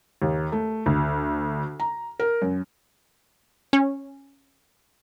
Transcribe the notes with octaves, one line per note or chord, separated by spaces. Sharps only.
D#2
A3
D2
A#5
A#4
F#2
C#4